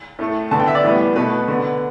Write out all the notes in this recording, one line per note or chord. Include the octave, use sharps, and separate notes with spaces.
A2 A3
D3 B3 A5
G5
E5
D5
A2 E3 G3 B3
B2 A3 B4
D3 B3